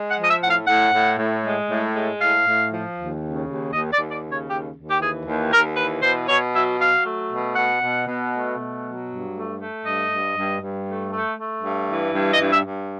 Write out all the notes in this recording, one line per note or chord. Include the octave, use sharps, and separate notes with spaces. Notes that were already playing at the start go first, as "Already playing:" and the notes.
Already playing: G#3
F#5
F3
D#5
E5
A2 F#5
F5
A2 F#5
A2
A2
G#3
A2
G#3
A2 F5
A2
F3
D#2
C#3
D#2
D#2 D#5
D5
D#2
D5
C#3
C#5
D#2 G4
D#2
G4
E3 G#4
D#2
D#2 A#4
E3 B4
B2 C5
B2 C#5
F#3 E5
F#3 F5
A3
B2
B2 F#5
B2
B2
A3
B2
F#3
G2
A3
A3
G2 D#5
G2
G2
G2
A3
A3
A3
G2
E3
G2
D#5
G2
E5
G2